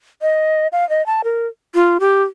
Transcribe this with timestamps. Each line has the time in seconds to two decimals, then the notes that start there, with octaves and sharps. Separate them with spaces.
0.22 D#5
0.72 F5
0.89 D#5
1.06 A5
1.24 A#4
1.75 F4
2.00 G4